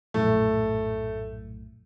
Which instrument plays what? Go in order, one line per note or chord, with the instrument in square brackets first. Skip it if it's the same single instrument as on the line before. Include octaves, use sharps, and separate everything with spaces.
[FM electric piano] A#1 F#2 A2 [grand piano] A3